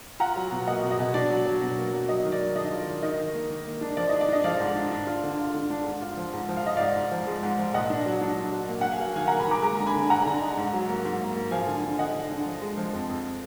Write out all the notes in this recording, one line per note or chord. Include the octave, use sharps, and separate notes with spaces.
F4 F#5 A#5
F#3
B2
A#3 D#5 F#5
B2
D#5
B2
D4 D5
F#3
F#3
B2
A#3
F#3
F#3 D#5
D#3
D5
D#3
D4 D#5
F4
D5
D#3
D#3 D#5
D#3
A#3
D#3
A#3
D4
F3 D5
D4 D#5
D5
D4 D#5
F3 D5 F5
G#2
D4
D4
F4
D3
F4
D3
D4
G#2
F4
F3
G#2
F3
F5
F4 D#5
G#2 D5 F5
G#2
F3
G#3
G#2
F3
A#2 D#5 F#5
D4
F#3
D4
D4
F#3
A#3
A#3 F#5
F5 G#5
F#3
D#3 F5 G#5
A#3 F#5 A#5
G#5 B5
D#3 A#5 D6
G#3 A#5 D6
D3
G#5 B5
D3
D3 F#5 A#5
D3
D#4
G#2
F#3
A#3
G#2
A#3
A#3
F3 F5 G#5
D3
D3
D3 D#5 F#5
D3
D3
F3
G#3
F3
F2
F2